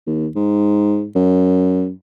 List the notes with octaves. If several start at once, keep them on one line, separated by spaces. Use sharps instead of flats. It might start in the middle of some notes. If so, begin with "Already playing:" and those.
D#2
G#2
F#2